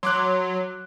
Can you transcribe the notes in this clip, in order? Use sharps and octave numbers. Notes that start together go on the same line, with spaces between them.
F#3 C6 D6 F#6